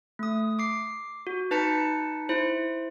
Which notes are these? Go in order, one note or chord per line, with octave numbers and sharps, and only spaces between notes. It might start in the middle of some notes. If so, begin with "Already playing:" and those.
A3 D#6
D6 C7
F#4
D#4 B4 A5 G6 B6 C#7
E4 C5